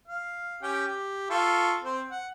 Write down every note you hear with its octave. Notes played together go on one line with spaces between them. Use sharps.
F5
C#4 G4 G5
G4
F4 A4 C#6
C4 C5
F#5